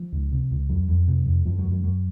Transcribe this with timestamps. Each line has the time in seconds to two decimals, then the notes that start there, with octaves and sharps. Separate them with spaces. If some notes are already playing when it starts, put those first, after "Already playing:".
Already playing: F3
0.12 C#2
0.32 C3
0.51 C#2
0.69 F2 F#3
0.89 F2
1.08 C3
1.26 F2
1.45 F#2 F3
1.59 F#3
1.65 F#2
1.71 F#3
1.84 F#2 F#3